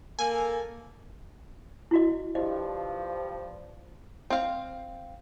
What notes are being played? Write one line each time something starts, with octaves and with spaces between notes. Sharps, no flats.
A#3 A4 G#5
E4 F#4 D#5
G2 F3 D#5
C4 F5